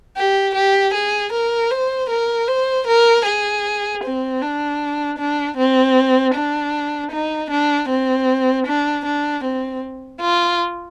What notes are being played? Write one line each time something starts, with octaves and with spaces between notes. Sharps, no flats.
G4
G4
G#4
A#4
C5
A#4
C5
A#4
G#4
C4
D4
D4
C4
D4
D#4
D4
C4
D4
D4
C4
F4